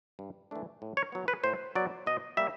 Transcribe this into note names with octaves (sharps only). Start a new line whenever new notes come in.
G2
E3 A3 D4
A2
C#5
F#3 B3
B4
A2 C5
F#3 B3 D5
B2 D#5
G3 A#3 E5